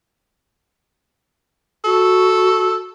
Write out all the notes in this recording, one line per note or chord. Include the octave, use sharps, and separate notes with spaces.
F#4 A4